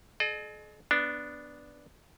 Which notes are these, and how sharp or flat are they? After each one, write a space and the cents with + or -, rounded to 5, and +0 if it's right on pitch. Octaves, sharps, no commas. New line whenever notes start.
G#4 +45 D#5 -45
B3 +0 D4 +0